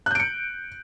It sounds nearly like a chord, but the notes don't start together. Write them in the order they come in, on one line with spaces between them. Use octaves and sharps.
F#6 G6 D7 C#7